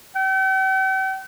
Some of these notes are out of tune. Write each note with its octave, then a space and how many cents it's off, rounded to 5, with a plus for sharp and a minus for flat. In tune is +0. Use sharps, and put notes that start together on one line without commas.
G5 -45